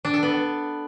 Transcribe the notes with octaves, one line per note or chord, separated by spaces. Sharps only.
D4
A4
B3